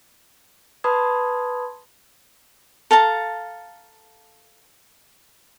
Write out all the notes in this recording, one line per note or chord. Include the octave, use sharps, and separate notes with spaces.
B4 A5 B5 C6 D#6 G#6
A4 F5 A5 A#5